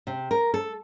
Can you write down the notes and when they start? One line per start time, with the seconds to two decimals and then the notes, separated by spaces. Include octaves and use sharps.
0.07 C3
0.31 A#4
0.54 A4